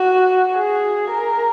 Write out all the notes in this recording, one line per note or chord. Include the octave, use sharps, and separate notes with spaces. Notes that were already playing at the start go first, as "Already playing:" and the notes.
Already playing: F#4
G#4
A#4